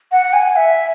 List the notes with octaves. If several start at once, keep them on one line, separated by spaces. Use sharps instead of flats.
F#5
G#5
E5